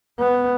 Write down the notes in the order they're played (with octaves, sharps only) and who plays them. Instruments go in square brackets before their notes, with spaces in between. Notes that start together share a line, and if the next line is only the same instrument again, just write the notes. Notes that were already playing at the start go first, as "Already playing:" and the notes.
[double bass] B3